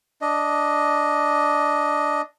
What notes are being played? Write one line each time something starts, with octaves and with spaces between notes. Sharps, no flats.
D4 D#5